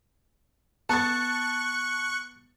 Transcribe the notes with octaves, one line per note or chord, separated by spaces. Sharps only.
B3 A5 C#6 F#6 A6 C#7